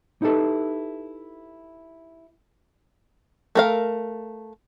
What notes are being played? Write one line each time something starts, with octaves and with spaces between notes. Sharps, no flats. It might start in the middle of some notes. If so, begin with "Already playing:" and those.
D#4 E4 G4 A4 B4
A3 A#4 F5